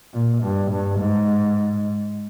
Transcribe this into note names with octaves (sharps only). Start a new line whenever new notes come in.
A#2
G2
G2
G#2